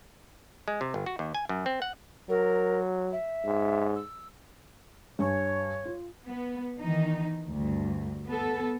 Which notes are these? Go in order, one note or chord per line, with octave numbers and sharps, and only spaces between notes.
G#3
C3
G1
F#4
D#2
G#5
F#2
C4
F#5
F#3 A#4
E5
G#2
E6
G2 C#5 G#5 C#6
F4
B3
D#3 E3 D#4
D2 G2
B3 A4